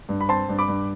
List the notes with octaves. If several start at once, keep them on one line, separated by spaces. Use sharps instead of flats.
G2
B5
C4 A5 C6
G2
B5 D6
G2